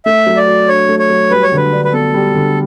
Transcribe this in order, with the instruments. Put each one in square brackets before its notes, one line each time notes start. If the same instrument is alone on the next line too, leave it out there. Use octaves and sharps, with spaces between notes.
[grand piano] A3 [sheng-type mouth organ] E5
[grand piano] F#3
[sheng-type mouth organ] D5
[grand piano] F#4
[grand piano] D4 [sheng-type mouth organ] C#5
[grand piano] A3
[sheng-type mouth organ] C#5
[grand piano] F#3
[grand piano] G3 [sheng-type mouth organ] B4
[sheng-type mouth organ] C#5
[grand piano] D3 [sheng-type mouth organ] B4
[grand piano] D4
[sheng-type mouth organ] B4
[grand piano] B3 [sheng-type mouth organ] A4
[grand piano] G3
D3